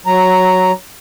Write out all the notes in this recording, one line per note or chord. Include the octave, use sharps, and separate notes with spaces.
F#3 A#5